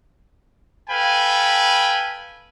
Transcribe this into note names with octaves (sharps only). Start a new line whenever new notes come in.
A4 B4 F5 G5 G#5 B5